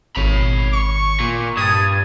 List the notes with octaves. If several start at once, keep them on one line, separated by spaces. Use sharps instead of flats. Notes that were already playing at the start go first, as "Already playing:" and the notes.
G#1 C#5 B5
C#6
A#2
G2 D#6 G#6 A6